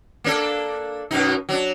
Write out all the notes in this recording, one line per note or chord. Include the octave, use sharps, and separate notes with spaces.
A#3 D4 A4
F#2 B2 D#4
F#3 D4